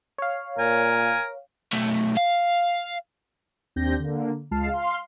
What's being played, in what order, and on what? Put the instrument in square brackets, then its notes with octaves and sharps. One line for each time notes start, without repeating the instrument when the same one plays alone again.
[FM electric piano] C#5 F5
[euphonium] A#2 [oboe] A#4 [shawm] G#5
[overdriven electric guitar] B1 A3
F5
[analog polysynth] D#2 C4 D4 G4 G6 A#6
D3 A#3
C#2 G#3 F4 A5 F6 C7
F5 C6